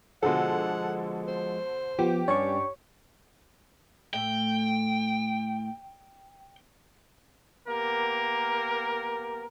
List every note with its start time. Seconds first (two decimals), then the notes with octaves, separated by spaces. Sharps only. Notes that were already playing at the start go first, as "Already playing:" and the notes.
0.23 B2 D3 F3 G#3 A4 F#5
1.28 C5
1.99 F3 B3 G4
2.28 G2 C#4 D4 C#5 D5 C#6
4.13 A2 A3 E5 G5
7.68 A#3 B3 G4 A#4